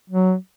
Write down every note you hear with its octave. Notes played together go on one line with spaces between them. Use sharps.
F#3